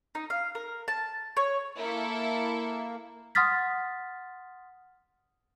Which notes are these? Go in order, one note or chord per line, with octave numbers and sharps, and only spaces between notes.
D#4
F5
A#4
A5
C#5
A#3 E4 A4
F#5 C6 D#6 F6 A6 B6